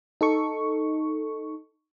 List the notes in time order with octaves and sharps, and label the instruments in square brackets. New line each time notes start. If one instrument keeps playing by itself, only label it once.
[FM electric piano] D#4 A4 C#6